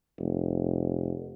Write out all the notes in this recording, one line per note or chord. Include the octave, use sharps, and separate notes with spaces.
F1